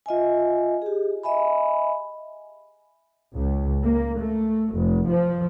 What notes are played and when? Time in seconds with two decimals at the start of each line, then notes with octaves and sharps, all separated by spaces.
0.06 F4 D#5 E5 G#5
0.82 G4 G#4
1.23 D#5 E5 G#5 B5
3.34 C#2
3.83 A#3
4.19 A3
4.73 F1
5.08 F3